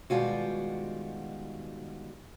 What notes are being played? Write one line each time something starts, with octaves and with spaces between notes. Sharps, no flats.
B2 D#3 G3 G#3 F4 F#4